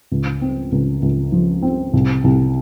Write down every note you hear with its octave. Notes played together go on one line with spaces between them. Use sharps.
C#2
C4
C#2
C#2
F3
C4
C2
C2